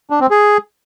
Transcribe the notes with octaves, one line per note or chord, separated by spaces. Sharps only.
D4
C4
G#4